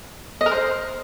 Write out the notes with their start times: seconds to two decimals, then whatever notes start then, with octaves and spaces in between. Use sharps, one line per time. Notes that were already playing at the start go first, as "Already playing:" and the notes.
0.41 D#5
0.46 A#4
0.51 C5